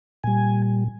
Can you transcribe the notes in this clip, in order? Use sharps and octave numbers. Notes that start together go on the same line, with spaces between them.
A#2 G3 G#5